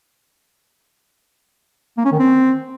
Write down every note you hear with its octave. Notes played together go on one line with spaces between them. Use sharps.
A#3
C#4
D#3
C4